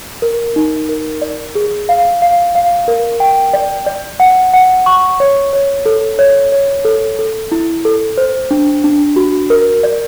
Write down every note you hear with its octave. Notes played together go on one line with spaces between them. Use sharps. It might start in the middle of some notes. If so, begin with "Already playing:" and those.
A#4
D#4
A#4
D5
G#4
F5
F5
F5
A#4
G5
D5
D5
F#5
F#5
C#6
C#5
C#5
A4
C#5
C#5
A4
A4
E4
A4
C5
D4
D4
F#4
A#4
D5